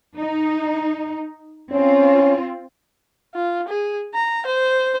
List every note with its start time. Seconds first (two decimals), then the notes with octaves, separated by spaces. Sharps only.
0.18 D#4
1.72 C4 C#4 F4
3.35 F4
3.68 G#4
4.14 A#5
4.46 C5